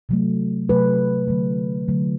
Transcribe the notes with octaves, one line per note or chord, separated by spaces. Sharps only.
C3 F#3 A3
C3 F#3 A3 B4
D3 F#3 A3
D3 F#3 A3